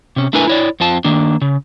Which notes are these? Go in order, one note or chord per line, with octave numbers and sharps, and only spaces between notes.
C3 C#4
A3 D4 E4 A#4 B4 G#5
E4 C#5 D5
F2 C4 F4 A5
D#3 A#3 D4
C#3